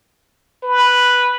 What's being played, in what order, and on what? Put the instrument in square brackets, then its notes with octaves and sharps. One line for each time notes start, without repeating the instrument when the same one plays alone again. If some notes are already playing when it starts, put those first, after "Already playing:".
[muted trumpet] B4